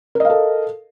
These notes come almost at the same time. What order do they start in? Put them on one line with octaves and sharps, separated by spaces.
A#4 D#5 F5 A4